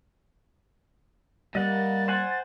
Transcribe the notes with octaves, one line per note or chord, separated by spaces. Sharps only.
G3 A#3 D#5 F#5 A6
C5 F#5 G#5